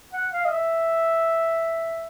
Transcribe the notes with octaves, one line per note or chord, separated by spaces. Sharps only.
F#5
F5
D#5
E5